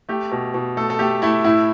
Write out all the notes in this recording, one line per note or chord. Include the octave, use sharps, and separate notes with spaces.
A3 G4
B2
B2
A3 A4
A4
A3 G4
A3 E4
A2 E4